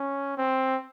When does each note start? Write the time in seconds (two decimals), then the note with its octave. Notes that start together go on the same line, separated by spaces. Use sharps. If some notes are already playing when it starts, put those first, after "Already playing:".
Already playing: C#4
0.37 C4